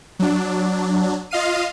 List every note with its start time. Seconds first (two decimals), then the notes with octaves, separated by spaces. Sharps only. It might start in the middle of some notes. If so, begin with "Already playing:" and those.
0.19 F#3 D4
1.31 F4 D#5 F5 F6 C7 D#7